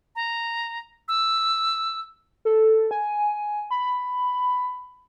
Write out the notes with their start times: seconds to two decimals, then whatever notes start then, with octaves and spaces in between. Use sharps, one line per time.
0.15 A#5
1.08 E6
2.45 A4
2.91 G#5
3.71 B5